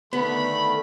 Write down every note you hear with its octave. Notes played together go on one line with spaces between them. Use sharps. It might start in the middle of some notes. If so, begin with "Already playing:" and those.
D3 D#3 A3 B3 B5